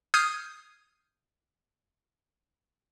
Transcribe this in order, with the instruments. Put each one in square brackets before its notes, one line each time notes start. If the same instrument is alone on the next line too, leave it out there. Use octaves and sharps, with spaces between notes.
[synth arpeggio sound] D#6 F6 G6 G#6 C7 D#7